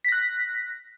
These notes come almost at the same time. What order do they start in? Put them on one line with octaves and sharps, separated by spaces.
B6 A#6 F#6